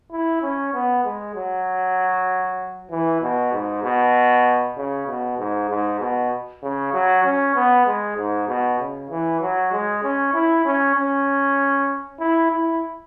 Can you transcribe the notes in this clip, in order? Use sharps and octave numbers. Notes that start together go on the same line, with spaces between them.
E4
C#4
B3
G#3
F#3
E3
B2
G#2
B2
C#3
B2
G#2
G#2
B2
C#3
F#3
C#4
B3
G#3
G#2
B2
C#3
E3
F#3
G#3
C#4
E4
C#4
C#4
E4
E4